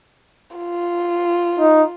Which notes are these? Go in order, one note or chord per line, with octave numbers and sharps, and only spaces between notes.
F4
D#4